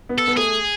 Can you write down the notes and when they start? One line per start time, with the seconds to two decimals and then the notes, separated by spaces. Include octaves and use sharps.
0.09 B3
0.18 A4
0.27 B3
0.37 A3 G#4